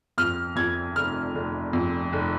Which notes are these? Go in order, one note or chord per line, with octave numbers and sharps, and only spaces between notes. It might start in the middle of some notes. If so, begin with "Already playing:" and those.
F2 F6
F2 G#6
F1 F6
F1
F2
F1